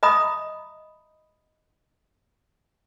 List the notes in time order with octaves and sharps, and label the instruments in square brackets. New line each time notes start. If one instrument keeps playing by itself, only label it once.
[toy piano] D#5 E5 A#5 B5 D#6